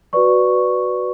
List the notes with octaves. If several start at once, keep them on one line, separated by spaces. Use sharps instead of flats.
F#4 B4 D5 C#6